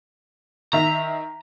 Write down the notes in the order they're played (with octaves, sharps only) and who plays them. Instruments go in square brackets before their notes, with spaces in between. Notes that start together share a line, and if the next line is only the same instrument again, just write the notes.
[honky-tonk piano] D#3 E5 B6 [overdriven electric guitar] A#5